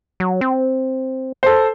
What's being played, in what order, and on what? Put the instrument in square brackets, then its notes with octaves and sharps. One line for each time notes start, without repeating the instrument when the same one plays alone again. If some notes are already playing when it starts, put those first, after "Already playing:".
[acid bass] F#3
C4
[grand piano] A4 C5